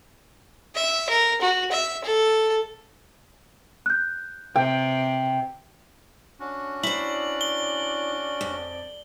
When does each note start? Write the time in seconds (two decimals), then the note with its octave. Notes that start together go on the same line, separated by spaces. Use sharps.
0.75 E5
1.09 A#4
1.41 F#4
1.72 E5
2.04 A4
3.86 F#6 G6
4.56 C3 G5
6.40 C#4 D4 F#4
6.83 E4 C5 D5 F#7
7.41 G7
8.41 F2